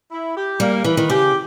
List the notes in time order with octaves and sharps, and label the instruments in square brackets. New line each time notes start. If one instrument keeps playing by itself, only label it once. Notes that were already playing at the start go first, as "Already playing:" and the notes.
[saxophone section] E4
G4
[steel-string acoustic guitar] G3 [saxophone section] A#3
[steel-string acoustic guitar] E3 [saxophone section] B4
[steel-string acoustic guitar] D#3
[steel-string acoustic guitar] C#3 [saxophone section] G4